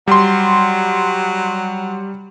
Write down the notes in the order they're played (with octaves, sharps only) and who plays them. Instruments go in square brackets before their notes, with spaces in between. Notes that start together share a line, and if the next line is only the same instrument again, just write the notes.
[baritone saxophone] F#3 [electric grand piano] G3 C6